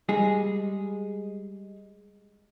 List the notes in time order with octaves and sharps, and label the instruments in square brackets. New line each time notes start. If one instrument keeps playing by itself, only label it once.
[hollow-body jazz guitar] G3 G#3 G#4